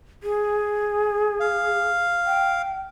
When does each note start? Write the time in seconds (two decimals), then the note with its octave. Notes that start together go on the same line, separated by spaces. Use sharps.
0.23 G#4
1.40 F5
2.27 G5